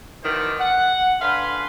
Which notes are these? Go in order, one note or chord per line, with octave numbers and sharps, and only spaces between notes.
B2 D#3 E3 C5 D5
F#5
D3 B4 F5 G#5 B5 C6